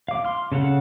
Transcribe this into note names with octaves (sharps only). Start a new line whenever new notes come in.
F5 D6
C6 F6
C#3 A4 F5 F#5